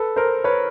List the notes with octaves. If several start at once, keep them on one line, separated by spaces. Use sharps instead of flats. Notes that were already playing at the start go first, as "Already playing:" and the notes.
Already playing: A4 B4
A#4 C5
B4 C#5